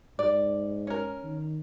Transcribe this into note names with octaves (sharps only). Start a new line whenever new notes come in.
G#2 D5
C#4 A#4
D#3